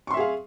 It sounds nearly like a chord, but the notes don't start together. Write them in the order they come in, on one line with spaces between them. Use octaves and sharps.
C#6 C6 E5 G#4 F5